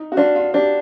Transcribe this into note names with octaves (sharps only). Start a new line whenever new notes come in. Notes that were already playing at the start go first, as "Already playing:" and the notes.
Already playing: D#4
F#4
D4 F4
F4
D4 G4